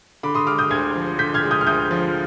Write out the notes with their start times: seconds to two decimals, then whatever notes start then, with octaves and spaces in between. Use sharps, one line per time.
0.23 D3 B5 D6
0.35 C6 D#6
0.47 G#3 D6 F6
0.58 D#6 G6
0.70 D2 F6 G#6
0.96 F3
1.19 D3 G6 B6
1.34 F6 G#6
1.43 G#3
1.51 D#6 G6
1.61 F6
1.67 D2 D#6 G6
1.91 F3